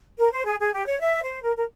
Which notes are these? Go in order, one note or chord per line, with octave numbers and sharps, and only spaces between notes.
A#4
C5
G#4
G#4
G4
C#5
E5
C5
A#4
A#4